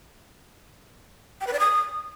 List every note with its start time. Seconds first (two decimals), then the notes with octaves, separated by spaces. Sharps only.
1.41 G5
1.47 B4
1.53 D5
1.59 D#6